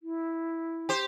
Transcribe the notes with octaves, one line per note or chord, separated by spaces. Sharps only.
E4
G4 C5